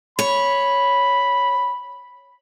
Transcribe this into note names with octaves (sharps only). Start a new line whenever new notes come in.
C#5 B5